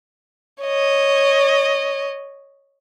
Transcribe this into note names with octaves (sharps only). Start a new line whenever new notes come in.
C#5 D#5